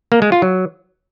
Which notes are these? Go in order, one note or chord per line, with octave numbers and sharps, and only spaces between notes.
A#3
G#3
F4
F#3